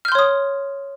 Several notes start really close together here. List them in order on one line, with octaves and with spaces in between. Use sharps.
F6 G6 C6 C#5 D#6